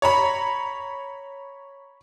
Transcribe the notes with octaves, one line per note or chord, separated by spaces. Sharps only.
C#5 A#5 B5